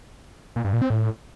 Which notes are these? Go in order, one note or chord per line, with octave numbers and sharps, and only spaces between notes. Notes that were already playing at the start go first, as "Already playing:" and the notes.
A#2
G2
A#2
C4
A2